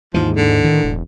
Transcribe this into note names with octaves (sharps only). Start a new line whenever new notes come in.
D#2 G#2 E3 F3
G#2 D3
A2 D#3
E1